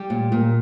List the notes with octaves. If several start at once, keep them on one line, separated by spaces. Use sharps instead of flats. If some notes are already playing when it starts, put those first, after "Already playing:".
Already playing: G3 G4
A#2
A#2